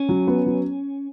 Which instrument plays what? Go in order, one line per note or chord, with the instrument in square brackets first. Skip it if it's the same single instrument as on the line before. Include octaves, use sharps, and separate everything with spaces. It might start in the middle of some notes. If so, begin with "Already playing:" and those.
Already playing: [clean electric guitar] C#4
[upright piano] F#3
B3
F#3